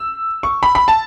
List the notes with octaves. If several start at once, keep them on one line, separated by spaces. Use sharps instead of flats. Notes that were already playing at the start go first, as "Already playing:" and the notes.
Already playing: E6
C#6
B5
B5
A5